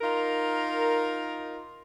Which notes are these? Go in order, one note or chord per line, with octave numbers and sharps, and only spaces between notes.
D#4 F4 A#4